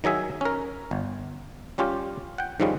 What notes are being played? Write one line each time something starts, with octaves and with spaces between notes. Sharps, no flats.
D#3 F#3 G#4 E5 G#5
C#4 A#4
G1
G3 C#4 F4 G4
F#5 G5
G#2 D#3 F3 G3 G#3 C#4